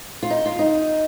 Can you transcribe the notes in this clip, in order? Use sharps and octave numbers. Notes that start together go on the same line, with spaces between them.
F4
D#4
F4
D#4